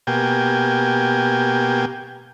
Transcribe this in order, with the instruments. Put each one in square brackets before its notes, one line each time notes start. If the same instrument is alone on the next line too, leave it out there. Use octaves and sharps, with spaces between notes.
[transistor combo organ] B2 A#3 G4 G5 G#5